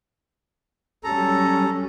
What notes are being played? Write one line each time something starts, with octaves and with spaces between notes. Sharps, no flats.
F#3 G3 C#4 A4 A#5